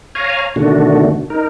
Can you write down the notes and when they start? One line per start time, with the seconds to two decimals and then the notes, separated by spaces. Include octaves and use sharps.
0.15 C#5 F5 G#5 A#5
0.56 B2 D3 D#3 A3 D4 F#4
1.30 D#4 A#4